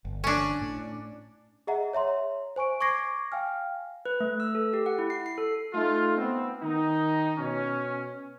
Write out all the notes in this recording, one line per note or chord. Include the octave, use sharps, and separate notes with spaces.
G1
C#4 D4
A2
G#4 D#5 E5 F#5 A#5
C#5 E5 A#5 C6
C5 G#5 C#6 D7
C#6 D6 G#6 A#6 C7 D7
F5 G5 G#5 F6
B4
A3
E6
A4
G4
F#5
E4
C7
C7
A4
A3 D#4 F4
B3 C4
D#3 D#4
B2 C#4